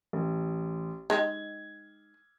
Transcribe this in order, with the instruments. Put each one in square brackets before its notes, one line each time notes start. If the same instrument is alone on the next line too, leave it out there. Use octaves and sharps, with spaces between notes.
[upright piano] A1
[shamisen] G#3 D#4 G4 [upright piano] G#6